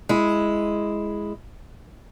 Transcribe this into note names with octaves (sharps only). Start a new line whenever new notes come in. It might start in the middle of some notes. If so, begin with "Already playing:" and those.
G#3 E4